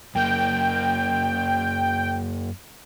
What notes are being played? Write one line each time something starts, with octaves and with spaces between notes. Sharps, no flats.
F#2 A#3 G5